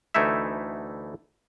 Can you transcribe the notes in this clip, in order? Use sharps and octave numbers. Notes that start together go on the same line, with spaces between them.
D2 E3 A3 D#4 E4 E5